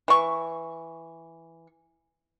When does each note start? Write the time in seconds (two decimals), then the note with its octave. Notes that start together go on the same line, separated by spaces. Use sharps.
0.08 E3 C#6